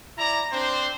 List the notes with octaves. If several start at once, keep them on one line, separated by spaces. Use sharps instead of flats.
E4 D5 A#5
C4 D4 C5